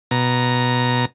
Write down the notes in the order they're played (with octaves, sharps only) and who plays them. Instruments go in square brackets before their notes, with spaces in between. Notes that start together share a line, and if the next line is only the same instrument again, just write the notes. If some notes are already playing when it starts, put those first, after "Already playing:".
[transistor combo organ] B2 A#5